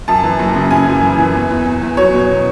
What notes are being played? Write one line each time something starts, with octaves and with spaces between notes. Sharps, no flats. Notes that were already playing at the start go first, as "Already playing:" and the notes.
F#2 A5
E3
F#1
C#3
C#3 G#5
F#2
E3
E3
E2
E2
E2
E2
F#3 C#5
B2